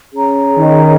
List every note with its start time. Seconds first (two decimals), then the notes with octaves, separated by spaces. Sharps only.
0.12 C#4 G#4 C#5 A#5
0.58 D#3